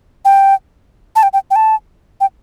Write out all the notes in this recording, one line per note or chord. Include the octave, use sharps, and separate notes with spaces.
G5
A5
G5
G5
G5
A5
G5